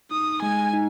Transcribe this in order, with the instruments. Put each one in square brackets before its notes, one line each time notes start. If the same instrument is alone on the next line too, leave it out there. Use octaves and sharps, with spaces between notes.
[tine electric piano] D#4 [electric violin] D#6
[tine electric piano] G#3 [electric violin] G#5
[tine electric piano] D#4